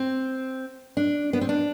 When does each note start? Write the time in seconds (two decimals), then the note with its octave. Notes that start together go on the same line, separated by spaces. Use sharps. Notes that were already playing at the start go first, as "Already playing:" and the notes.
Already playing: C4
0.97 D4
1.33 B3
1.41 C4
1.49 D4